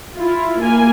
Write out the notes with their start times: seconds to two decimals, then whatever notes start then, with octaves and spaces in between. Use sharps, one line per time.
0.14 E4 F4
0.59 A#3 G#5